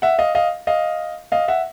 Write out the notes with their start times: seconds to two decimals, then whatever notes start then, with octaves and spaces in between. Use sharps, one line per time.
0.02 E5 F#5
0.18 D#5 F5
0.35 D#5 F5
0.67 D#5 F5
1.32 D#5 F5
1.48 E5 F#5